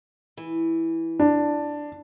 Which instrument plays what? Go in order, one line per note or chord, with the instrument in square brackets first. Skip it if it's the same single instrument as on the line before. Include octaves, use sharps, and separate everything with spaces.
[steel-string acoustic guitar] E3
[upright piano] D4